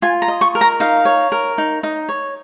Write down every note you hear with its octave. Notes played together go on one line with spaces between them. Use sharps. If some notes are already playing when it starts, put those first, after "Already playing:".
F4 G#5
A#5
D#5
C#6
A#4
A#5
D#4 F5
C#5
A#4
D#4
D#4
C#5